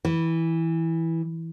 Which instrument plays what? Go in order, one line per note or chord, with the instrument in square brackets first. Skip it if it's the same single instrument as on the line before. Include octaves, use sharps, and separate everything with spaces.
[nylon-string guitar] E3